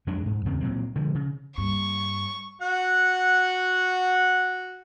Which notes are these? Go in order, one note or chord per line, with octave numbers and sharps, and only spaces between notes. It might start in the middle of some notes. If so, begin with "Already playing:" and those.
F2 F#3 G#3 D4
G#2
E2 C#3 C4
A#2 F#3 C4
D3 F3 G#3
C#3
G2 A#3 C#6
F#4 F#5